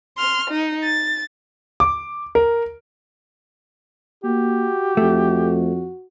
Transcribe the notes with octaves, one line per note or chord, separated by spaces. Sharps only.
C6 F6
D#4
A6
D6
A#4
A#3 F#4 G4
F2 A3